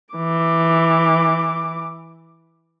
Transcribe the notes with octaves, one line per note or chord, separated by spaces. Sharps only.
E3 D6